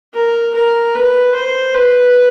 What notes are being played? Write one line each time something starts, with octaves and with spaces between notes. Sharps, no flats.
A#4
A#4
B4
C5
B4